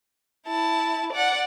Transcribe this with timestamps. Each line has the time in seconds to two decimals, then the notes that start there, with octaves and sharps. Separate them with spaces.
0.47 E4 A5
1.13 D5 F#5